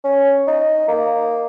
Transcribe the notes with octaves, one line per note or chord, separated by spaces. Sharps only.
C#4
D#4
A#3